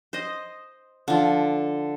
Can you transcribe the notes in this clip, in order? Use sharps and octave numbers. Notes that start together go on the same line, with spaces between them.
C5 D#5
D3 F3